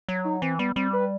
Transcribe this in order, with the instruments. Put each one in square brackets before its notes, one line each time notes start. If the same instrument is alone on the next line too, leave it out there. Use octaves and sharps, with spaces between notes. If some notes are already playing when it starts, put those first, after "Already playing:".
[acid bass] F#3
[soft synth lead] D#4
[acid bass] E3 [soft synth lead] C4
[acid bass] G3 [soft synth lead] B3
[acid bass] G3 [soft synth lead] C4
[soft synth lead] B4